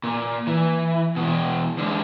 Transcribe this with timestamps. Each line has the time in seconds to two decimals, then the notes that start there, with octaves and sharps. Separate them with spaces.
0.04 A#2
0.47 E3
1.16 B2 E3
1.78 D3 G#3